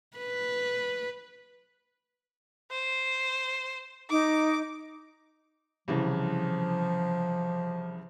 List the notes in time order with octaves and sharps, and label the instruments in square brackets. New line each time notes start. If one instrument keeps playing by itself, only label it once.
[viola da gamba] B4
[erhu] C5
[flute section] D#4 [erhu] D6
[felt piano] C2 C#3 E3 [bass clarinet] F3